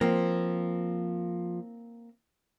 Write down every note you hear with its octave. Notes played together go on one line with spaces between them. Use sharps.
F3 A#3 C4